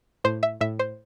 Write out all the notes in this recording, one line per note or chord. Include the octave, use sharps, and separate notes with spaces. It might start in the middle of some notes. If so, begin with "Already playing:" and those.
A2 C5
E5
A2 E5
C5